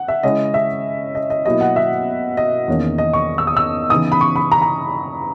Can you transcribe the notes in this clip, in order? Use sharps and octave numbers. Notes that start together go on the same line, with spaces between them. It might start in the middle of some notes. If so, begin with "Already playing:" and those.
Already playing: F#5
E5
C#3 G#3 C#4 E4 D#5
E5
D#5
D#5
B2 F#3 A#3 E4 D#5
F#5
E5
D#5
E2 D#3 A#3 C#4
D#5
C#6
E6
D#6
E6
C#3 E3 B3 D#4 D#6
B5
C#6
B5
A#5
A#5